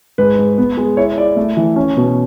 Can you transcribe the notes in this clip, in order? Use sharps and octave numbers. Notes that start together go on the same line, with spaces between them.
G#2 B4
G#2
B3
G#3
E4 C#5
E4 D5
A3
E3
C#4
B2